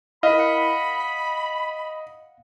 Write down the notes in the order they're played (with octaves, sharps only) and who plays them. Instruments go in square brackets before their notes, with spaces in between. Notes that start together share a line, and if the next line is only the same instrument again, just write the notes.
[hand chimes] E4 A#4 [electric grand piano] D#5 [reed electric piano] F5 [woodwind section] B5
[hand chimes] F#5 C#7